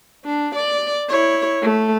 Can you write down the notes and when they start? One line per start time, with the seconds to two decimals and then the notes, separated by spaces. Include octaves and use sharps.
0.25 D4
0.55 D5
1.09 E4 C#5
1.62 A3